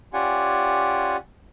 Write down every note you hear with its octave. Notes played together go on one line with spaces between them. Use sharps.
C#4 F4 G4 D5 F#5 G#5